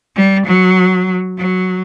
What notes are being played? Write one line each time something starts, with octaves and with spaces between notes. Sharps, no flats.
G3
F#3
F#3